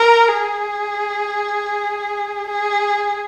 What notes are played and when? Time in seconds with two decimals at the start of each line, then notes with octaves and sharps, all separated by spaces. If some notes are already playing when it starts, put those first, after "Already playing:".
Already playing: A#4
0.28 G#4
2.48 G#4